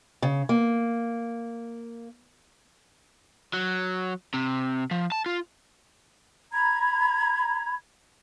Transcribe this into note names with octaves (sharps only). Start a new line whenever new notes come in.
C#3
A#3
F#3
C3
F3
A5
F4
A#5 B5 G#6